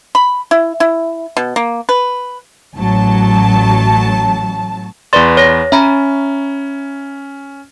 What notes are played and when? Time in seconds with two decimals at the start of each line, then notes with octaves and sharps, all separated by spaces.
0.15 B5
0.51 E4
0.80 E4
1.37 B2
1.56 A#3
1.89 B4
2.77 A1 F#3 A5
5.13 E2 B4 D5 C6 A6
5.37 C#5 A#6
5.72 C#4 E5 A#5 B5